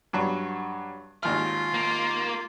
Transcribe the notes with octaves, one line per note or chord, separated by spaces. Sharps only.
G2 F#3
G#1 D#2 F4 F6
A#3